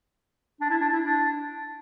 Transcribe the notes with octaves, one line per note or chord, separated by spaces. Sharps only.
D4
E4
D4
E4
D4